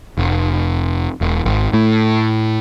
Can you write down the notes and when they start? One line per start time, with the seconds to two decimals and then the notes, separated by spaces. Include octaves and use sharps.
0.18 F1
1.21 E1
1.45 G#1
1.74 A2